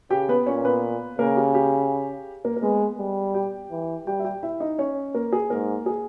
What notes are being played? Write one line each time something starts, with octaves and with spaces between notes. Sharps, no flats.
C#3 G4 G5
B3 B4
A#2 C#4 C#5
B3 B4
C#3 A#3 A#4
G4
G4
A#3 A#4
A#4
G#3 B3 B4
G3
G4 G5
E3
G3 G4 G5
E5
G4 G5
E4 E5
D#4 D#5
C#4 C#5
A#3 A#4
G#4
G#2 A#3 A#4
G#4